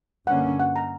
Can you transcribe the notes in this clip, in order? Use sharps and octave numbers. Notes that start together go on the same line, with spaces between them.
G2 D3 A#3 C#4 F#5
F#5
A#5